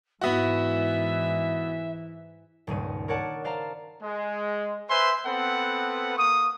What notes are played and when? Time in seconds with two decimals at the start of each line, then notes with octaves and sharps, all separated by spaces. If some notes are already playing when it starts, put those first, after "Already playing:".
0.21 G#2 E3 B3 F#4 E5
2.67 D#1 C#2 G2 D#7
3.08 A#4 C#5 D5 F#5 A5
3.44 C5 D5 F5 A5 A#5
4.02 G#3
4.90 B4 C5 E5 G#5 C6
5.25 B3 C4 A4 B4 F#5
6.17 A#3 C#6 D#6